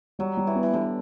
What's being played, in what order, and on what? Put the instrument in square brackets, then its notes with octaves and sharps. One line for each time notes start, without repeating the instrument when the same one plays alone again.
[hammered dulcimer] F#3 [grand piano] G3
[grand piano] G3
[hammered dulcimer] E3
[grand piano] B3
[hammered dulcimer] E3
[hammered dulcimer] D3 [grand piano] G3